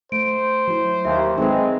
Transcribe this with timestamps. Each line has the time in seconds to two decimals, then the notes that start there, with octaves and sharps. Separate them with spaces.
0.12 A3 C5 D7
0.68 F#3 E4
1.05 D#2 E5
1.38 G#3 C4 D#4 A4 B4